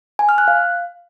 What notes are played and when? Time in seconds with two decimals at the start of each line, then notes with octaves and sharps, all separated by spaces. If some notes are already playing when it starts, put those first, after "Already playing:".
0.19 G#5
0.29 F6
0.38 F#6
0.48 F5